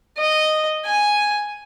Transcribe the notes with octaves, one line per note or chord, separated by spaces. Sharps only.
D#5
G#5